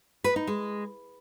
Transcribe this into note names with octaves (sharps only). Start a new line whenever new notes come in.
B4
D#4
G#3